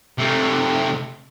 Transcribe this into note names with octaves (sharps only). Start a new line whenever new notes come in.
C3 A3